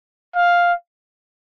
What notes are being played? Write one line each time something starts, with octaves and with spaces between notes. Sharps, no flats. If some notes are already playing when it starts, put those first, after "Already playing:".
F5